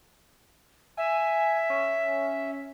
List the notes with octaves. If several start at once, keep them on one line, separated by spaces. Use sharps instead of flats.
E5 G#5
C#4